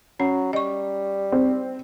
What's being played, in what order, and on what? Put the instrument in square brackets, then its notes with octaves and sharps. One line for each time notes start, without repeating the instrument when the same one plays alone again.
[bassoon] F#3 [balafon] C#4
[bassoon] G3 [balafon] D#5 C#6
[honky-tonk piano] C4